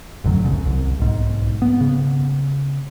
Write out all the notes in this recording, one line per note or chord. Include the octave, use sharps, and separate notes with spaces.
A1 F#2 D3 F#3
E1 C2 C#3
C2
B1 G#2
B3
C#3